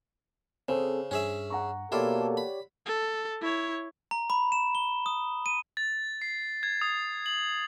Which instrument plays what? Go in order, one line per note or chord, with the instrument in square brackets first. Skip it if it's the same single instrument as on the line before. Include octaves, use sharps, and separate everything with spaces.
[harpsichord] C#3 [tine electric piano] C4 G#4 A4 [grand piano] C5
[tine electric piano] G2 [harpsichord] C#4 G#4 E5
[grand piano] F#5 A#5 C#6
[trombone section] B2 A#3 A4 [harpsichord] E4 F4 [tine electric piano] G4 C#5 D5
[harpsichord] B5
[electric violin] A4
E4 C#5
[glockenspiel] A#5
B5
E7
G7
D#6
D#7
[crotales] A6
C7
G#6
D#6
F#7